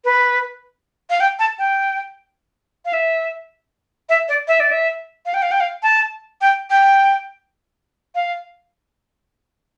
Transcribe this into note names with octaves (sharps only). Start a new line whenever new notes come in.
B4
F5
G5
A5
G5
F5
E5
E5
D5
E5
D5
E5
F5
G5
F5
G5
F5
A5
G5
G5
F5